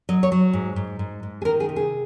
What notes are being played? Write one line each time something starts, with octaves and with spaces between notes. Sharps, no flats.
F#3 D#5
C#5
F#3
G#2
G#2
G#2
G#2
G#4
D#3 A#4
G#4
C3
G#4